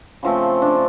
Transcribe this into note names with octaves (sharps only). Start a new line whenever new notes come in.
C#3 F3 A3 C4
D4